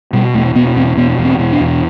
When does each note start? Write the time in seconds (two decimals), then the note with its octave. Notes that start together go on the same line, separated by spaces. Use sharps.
0.13 B2 G3
0.34 E2 A3
0.55 B2 B3
0.76 E2 C4
0.97 B2 B3
1.18 E2
1.25 C4
1.39 B2
1.53 D4
1.60 E2